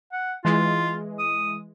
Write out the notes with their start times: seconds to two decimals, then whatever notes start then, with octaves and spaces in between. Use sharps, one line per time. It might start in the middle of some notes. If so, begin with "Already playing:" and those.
0.12 F#5
0.45 E3 G#3 F4
1.18 D#6